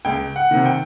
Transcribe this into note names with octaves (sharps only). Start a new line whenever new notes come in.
C#2 G5
F#5
C3 D#3
G5